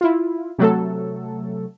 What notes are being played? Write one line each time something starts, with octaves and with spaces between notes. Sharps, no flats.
E4 F4
C3 F#3 A3 A4